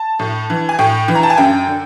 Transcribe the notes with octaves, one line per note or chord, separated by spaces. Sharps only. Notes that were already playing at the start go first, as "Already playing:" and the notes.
Already playing: A5
A2
E3
G#5
A2 G5
E3
A#5
A5
G#5
F#2 G5
D3